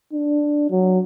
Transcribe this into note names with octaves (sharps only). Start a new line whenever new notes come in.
D4
F#3